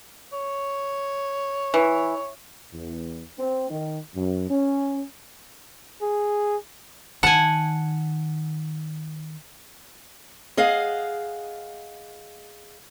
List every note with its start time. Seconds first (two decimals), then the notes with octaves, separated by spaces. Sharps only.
0.33 C#5
1.74 E3
2.74 E2
3.39 C4
3.70 D#3
4.15 F#2
4.50 C#4
6.02 G#4
7.23 D#3 F#5 G#5 A5
10.57 G#4 D#5 F5 F#5